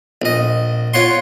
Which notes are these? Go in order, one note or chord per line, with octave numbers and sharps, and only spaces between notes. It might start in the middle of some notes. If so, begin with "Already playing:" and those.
A#1 D#5
F4 C#5 F#5 C6